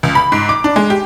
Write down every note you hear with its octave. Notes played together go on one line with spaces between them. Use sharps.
C#2
B5
G#2
D6
D4
G#3
G4